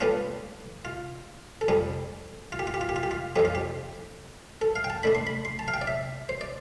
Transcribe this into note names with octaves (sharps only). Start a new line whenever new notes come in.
D3 G3 B3 D4 F4
F4
A4
F2 D3 G3 G4
F4
G4
F4
G4
F4
G4
F4
G4
F4
F2 D3 F3 G4
F4
G4
A4
F5
G5
A5
D3 A3 D4 B5
C6
B5
C6
A5
F5
G5
D5
E5
C5
D5